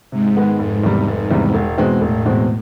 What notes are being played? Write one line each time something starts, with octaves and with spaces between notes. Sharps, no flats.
G#2 C3
D#3 G#3 B3
F1 G#2
E2 C3 D#3 G3
F1
E2 C3 D#3 G3
E1
E2 B2 G#3 C4
E1 A2
E2 B2 G#3 C4